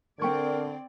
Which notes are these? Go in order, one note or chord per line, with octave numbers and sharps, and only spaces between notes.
D3 C4 A#4 D5 G5 C#6 G#6